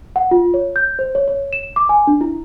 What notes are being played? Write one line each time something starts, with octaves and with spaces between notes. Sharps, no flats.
F#5
F4
C#5
G6
C5
C#5
C#5
E7
D6
G#5
D4
E4